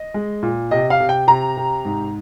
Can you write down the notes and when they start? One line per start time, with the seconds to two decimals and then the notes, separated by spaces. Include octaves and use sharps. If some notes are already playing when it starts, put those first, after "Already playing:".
Already playing: D#5
0.14 G#3
0.43 A#2
0.71 C3 D#5
0.90 F5
1.00 C3
1.09 G5
1.27 C3 A#5
1.57 C3
1.85 G#2